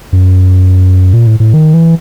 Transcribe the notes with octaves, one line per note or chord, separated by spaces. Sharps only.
F#2
A#2
A2
A2
D#3
E3